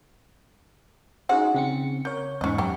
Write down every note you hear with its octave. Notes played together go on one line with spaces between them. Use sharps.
C#4 D#4 F#4 G#4 C5 F#5
C#3 C4 C#7
A#3 C#5 G6
E2 G#2 C#4 D#5 C#6
F#2 G3 G4